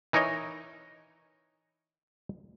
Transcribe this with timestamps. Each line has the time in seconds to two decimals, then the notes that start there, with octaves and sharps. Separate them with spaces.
0.13 E3 D#4 A#4 C#5 D#5